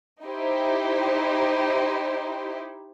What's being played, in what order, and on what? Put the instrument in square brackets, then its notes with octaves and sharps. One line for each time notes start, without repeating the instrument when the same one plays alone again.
[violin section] D#4 E4 G4 C5